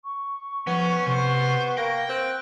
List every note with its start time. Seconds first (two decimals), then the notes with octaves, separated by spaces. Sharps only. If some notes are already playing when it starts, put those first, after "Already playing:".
0.04 C#6
0.67 F3 B3 C#4
1.06 C3 B3 C5
1.77 A#3 G5 A#6
2.09 C4 F#6